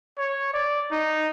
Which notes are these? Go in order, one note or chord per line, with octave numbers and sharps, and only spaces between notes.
C#5
D5
D#4